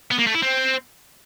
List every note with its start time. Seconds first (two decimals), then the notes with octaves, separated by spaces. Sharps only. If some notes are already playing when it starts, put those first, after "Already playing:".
0.11 B3
0.19 A#3
0.27 A3
0.35 E4
0.43 C4